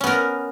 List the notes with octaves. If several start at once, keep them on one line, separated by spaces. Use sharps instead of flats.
B3 C#4 A#4